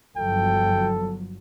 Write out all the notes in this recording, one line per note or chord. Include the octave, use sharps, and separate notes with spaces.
G1 F3 F#3 A4 G5